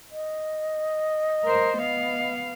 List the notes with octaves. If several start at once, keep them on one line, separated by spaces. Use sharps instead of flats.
D#5
A#4 C5
B3 F5